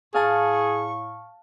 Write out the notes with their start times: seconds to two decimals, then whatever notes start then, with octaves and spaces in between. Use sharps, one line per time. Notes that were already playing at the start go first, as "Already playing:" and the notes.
0.14 A2 G#4 F5 A5 C#6